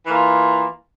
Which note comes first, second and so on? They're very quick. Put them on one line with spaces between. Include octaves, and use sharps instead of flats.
E3 A#3 F4